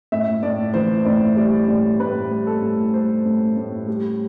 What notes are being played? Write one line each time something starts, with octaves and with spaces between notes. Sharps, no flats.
A2 E5
A2 D5
E3 C5
A2 D5
G3 D5
A2 D5
A2 B4
G3
A4
A2
G3 C5
A2
A2
G3